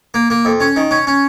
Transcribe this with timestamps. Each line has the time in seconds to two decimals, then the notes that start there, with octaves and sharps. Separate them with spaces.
0.14 A#3
0.30 A#3
0.45 F2
0.60 C#4
0.76 D#3
0.91 C#4
1.07 C#4